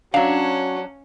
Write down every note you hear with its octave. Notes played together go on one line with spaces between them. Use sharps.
F#3 C#4 D4 F#4 F5